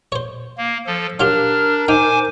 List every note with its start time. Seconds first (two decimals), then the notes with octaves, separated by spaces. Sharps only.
0.12 C5 C#5
0.57 A#3
0.87 F3 A4
1.20 F#3 D4 F4 G4 A#4 F6
1.88 D#4 C5 G5 G#5 D6